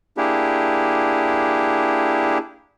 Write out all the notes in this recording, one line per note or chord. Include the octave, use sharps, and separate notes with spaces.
A#3 D4 E4 G4 G#4